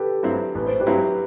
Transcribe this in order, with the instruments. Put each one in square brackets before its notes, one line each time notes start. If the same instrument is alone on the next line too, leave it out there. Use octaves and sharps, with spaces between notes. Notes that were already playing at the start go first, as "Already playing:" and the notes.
Already playing: [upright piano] G4 A4 B4
[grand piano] G2 F#3 C4 E4
[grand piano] A1 [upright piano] B4
[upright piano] C5
G4 B4
[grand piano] G2 F#3 C4 E4